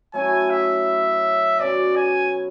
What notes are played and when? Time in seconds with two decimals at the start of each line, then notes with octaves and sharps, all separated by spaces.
0.14 F#3 A3 C#4 E4 G#5
0.50 E5
1.59 B2 F#3 C#4 D5
1.95 G#5